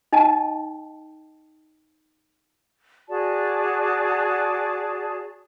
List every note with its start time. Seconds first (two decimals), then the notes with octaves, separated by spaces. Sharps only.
0.13 D#4 D#5 G5 A5
3.09 F#4 G#4 D5 A5